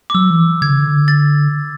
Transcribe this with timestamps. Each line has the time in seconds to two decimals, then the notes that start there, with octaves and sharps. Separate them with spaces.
0.10 D6
0.14 F#3 E6
0.30 E3
0.62 D3 G#6
0.70 C#3
0.79 D3
1.08 A6